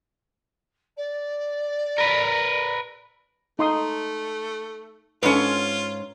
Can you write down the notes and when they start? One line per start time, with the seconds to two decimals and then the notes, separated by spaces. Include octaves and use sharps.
0.97 D5
1.98 A#4 B4
3.59 A3 D#4 C6 D#6
5.23 G#2 C#4 F4 A4 B4